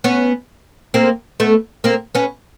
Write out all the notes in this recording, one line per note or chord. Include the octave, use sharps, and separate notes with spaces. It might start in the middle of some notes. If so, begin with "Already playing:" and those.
B3 C#4
A#3 C4
A3 B3
A#3 C4
B3 C#4